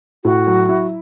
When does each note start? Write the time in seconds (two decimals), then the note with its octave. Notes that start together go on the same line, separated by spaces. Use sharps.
0.24 A2 F#4
0.47 F#3
0.69 E4